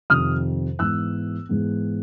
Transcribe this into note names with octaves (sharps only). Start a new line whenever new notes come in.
F2 C3 D#3 D#6 F6
G#2 E3 G#3 B3 E6 F#6
G#2 E3 G#3 B3